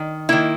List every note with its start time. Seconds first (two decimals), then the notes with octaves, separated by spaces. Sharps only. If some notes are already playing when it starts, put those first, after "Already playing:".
Already playing: D#3
0.29 D#3 A#3 E4